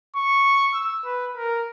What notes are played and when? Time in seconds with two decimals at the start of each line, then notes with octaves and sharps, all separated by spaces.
0.16 C#6
0.74 E6
1.05 B4
1.37 A#4